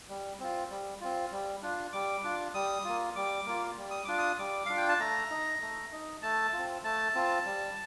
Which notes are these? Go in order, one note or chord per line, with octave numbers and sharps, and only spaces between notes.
G3
C4 F4
G3
C4 F4
G3
D4 F4
G3 D6
D4 F4
G3 D#6
A#3 F4
G3 D6
A#3 F4
G3
D#6
D4 F4 D6
D#6
G3 D6
D4 F4 F5
G5
A5
A3 A#5
D#4
A3
D#4
A3 A5
C4 F4
A3 A5
C4 F4
G3